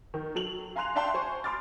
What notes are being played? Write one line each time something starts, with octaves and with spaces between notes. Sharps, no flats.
D#3
F#3 A4 F7 F#7
F5 G#5 A#5 C6 F#6 F7
D5 E5 F5 G5 A5 C6
C5 G#5 C#6
B5 C6 D6 F6 A6